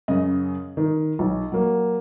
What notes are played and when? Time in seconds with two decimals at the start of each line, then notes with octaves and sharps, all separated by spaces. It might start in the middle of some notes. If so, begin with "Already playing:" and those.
0.08 F#2 C#3 D#5
0.77 D#3
1.19 B1
1.52 F#3 A#3